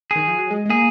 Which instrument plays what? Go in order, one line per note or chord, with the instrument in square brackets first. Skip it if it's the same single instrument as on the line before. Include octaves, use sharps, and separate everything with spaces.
[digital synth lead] D#3 [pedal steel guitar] G#4
[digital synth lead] F3
F#3
G#3
G#3
[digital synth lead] A#3 [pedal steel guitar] G#4